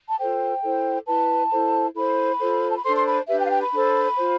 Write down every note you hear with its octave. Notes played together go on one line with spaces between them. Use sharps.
A5
F4 A4 C5 G5
E4 A4 C5
E4 B4 A5
E4 A4 C5
E4 A4 C5 B5
F4 A4 C5
A5
B5
D4 A4 C5 C6
C6
B5
D4 G4 B4 E5
G5
F5
G5
B5
D4 A4 C5
F4 C5